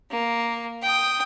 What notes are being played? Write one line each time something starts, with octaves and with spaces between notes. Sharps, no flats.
A#3
G5 D#6